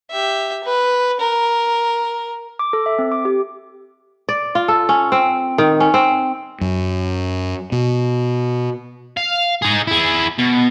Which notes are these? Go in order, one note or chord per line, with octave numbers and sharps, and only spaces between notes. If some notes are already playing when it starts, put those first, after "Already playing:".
G4 E5
B4
A#4
D6
A4
E5
C4
D6
G4
D5
F4
A4
C#4
C4
D#3
C#4
C4
F#2
B2
F5
D#4 G#4
E4 G#4
B2